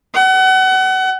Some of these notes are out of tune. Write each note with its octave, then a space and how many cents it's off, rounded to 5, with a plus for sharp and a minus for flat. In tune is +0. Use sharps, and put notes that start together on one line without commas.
F#5 +30